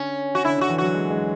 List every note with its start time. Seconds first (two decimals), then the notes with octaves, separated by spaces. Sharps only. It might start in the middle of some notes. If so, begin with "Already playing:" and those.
Already playing: D3 C#4
0.35 F#4
0.45 D3 E4
0.58 D3 F#4
0.70 E3
0.78 F#3 F#4
0.94 G#3
1.10 G#3